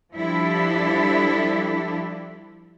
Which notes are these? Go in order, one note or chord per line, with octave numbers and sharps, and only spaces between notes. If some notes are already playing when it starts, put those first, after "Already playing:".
F3 G3 D4 E4 G4 A4